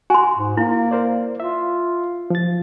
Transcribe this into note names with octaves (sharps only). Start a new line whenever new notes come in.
F#4 G#5 C6
G#2
A#3 E4
A#4 C5 D5
F4 E5
F3 A6